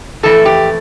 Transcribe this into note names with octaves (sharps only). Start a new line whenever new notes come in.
F2 E3 A3 A4
G4